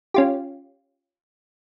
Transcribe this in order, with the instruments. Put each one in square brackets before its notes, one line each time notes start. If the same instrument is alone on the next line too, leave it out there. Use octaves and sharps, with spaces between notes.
[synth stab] C#4 F4 G4